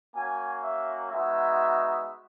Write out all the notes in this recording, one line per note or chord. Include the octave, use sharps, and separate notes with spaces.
A#3 C#4 F#4 G#5
E5
G#3 B3 D#4 F#4 E5